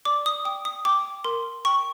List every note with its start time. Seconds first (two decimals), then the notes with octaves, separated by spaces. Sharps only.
0.05 D5 D6
0.26 D#6
0.45 G5 D#6
0.65 D#6
0.85 G5 D6
1.24 A#4 C6
1.65 G5 C#6